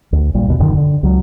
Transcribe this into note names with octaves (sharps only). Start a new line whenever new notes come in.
D2
A#1 A#2 G3
A#1 D#2 B2
D#1 F#2 D3 D#3
D3
C#2 F#3